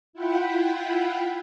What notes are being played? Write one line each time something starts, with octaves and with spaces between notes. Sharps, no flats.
E4 F4 F#5 G5 B5